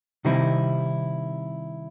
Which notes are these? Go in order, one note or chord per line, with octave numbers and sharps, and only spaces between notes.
C3 D#3 G3 C4 D#4 E4